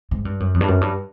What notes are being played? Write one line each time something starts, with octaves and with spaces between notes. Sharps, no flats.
G#2
G2
F#2
F2
G2
F#2
G2